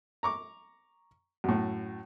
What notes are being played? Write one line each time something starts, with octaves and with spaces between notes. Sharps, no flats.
A#5 C#6 D6
F#2 A2